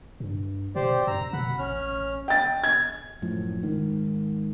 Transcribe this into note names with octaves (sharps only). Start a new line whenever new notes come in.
G2
B2 G4 C5 D5
F#2 A#5 E6
B2 F#5 B5
A1 C#4 F6
G5 A6
G#6
F#2 A2 F3
G#2 D#3